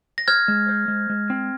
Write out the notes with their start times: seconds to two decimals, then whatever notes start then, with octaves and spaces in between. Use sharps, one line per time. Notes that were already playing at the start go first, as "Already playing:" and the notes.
0.18 A#6
0.28 C5 F6 G#6
0.48 G#3
0.69 C5
0.88 G#3
1.10 G#3
1.30 C4